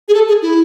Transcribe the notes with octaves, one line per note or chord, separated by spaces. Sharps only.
G#4
A4
G#4
E4